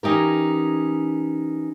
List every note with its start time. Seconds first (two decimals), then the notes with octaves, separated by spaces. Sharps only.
0.03 E3 C#4 D#4 G4 A#4